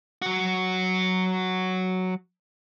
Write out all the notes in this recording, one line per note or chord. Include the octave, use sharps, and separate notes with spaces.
F#3 F#4